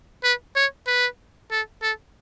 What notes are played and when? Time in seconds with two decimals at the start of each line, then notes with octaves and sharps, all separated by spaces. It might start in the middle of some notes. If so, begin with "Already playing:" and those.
0.23 B4
0.56 C#5
0.87 B4
1.51 A4
1.82 A4